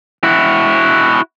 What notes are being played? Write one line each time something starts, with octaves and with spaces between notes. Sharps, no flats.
E4 F#4